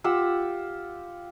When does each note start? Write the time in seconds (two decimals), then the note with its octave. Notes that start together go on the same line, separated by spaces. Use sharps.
0.04 F4 G4 F#5 E6